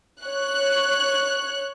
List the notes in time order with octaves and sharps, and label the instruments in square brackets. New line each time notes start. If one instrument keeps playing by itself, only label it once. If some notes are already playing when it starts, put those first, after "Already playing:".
[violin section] C#5 F#6